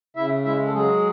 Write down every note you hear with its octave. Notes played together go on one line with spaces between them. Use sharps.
C#3 E4 E5
G#3 E4 E5
A4
F#3 G#3 G#4